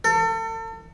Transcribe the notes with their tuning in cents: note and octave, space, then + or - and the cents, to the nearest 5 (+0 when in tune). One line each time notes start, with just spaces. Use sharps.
A4 +35